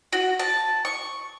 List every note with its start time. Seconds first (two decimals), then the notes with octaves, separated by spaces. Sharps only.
0.13 F#4
0.39 A5
0.85 C#6